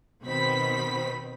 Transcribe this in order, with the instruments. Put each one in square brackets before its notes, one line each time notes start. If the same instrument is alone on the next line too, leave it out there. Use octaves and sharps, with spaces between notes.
[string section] B2 D#3 C4 B5 B6